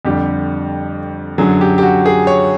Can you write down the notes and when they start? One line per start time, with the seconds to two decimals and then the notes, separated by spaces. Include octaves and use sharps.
0.05 F2 D3 G3 G4
1.38 F#2 D3 F#3 G#4
1.61 G4
1.78 G4
1.83 F#4
2.06 G#4
2.27 C#5